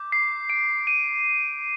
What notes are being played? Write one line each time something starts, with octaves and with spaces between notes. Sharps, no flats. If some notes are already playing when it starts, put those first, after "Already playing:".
Already playing: D6 G6
C7
D7
D#7